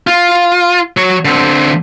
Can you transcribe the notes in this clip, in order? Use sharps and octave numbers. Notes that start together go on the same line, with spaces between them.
F4
F#3 C#5
D3 C4